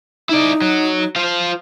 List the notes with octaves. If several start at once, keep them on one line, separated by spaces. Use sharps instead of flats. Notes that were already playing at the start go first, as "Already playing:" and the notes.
D#4 E4 D5
F#3
F4 C5 F5